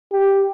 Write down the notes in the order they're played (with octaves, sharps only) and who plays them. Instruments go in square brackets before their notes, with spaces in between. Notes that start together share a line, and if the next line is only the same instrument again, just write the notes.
[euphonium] G4